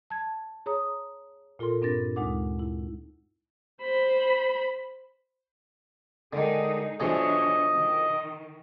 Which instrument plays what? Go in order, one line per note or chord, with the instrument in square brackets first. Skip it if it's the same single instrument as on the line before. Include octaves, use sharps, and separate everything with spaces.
[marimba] A5 G#6
G#4 C#5 A#5 D#6
A#2 F4 A4 A#4 C6
G2 C4 D4 A#4 A6 A#6
D2 G#3 D#4 F#5 D6
E4
[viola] C5 B5
[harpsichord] D3 D#3 [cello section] G#3 D#4 G#4
[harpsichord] B1 F3 G#4 [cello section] E3 D4 C#5 [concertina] D#5
[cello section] D#3